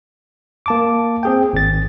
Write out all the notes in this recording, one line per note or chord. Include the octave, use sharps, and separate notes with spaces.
A#3 A5 D6
C4 G#4 G5
G#1 A6